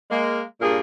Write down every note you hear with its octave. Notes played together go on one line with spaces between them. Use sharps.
G#3 A#3
G2 A#2 A#3 G#4 A#4